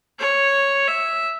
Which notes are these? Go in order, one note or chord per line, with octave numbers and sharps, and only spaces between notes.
C#5
E5